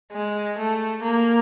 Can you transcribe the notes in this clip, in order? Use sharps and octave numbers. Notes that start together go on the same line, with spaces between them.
G#3
A3
A#3